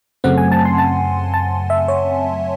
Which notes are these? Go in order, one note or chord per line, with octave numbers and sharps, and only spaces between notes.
F#2 C#3 F#3 A3 C4 F#5
G#5
A5
C6
A5
A5
E5
C#5